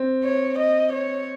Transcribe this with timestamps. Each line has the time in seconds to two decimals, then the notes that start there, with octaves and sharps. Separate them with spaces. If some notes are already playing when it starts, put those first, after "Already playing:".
Already playing: C4
0.24 C#5
0.59 D#5
0.93 C#5